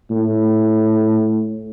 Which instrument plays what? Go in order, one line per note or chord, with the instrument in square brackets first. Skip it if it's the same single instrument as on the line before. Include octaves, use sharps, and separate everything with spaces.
[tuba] A2